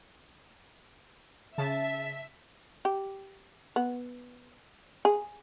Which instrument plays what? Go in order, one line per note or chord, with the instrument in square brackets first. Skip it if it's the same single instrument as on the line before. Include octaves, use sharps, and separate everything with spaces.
[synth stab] C#3 A5 [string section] E5
[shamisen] G4
B3
G#4